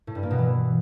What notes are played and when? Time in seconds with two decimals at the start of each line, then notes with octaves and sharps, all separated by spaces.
0.07 A2
0.15 G2
0.23 A#3
0.31 B2
0.38 E3